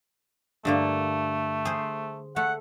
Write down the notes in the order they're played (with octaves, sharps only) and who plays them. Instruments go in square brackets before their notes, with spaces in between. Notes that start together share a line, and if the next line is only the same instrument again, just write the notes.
[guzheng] G2 D3 A#3 [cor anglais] A3
[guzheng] G#4 C5
[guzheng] A3 [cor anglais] F#5